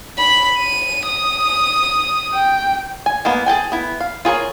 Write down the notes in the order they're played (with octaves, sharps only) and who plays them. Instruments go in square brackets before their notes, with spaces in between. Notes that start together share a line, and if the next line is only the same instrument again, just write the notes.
[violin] B5
D#7
D#6
[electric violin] G5
[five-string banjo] G#5
G#3 A#3 B3
G#4 A4 G5 G#5
B3 E4
F5
F4 G#4 A#4 C#5